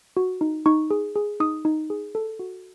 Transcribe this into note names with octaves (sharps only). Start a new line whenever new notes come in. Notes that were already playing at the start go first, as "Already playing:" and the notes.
F#4
D#4
D#4 C#6
G#4
G#4
D#4 D#6
D#4
G#4
A4
F#4